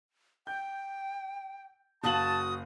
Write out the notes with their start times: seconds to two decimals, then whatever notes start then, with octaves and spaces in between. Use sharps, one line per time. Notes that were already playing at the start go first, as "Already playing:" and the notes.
0.47 G5 G6
2.04 F#1 F#4 F5 A5 D#6 F#7